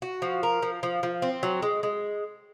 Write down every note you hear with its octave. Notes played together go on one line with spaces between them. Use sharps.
F#4
F3
A#4
F3
F3
F3
C4
F#3
G#3
G#3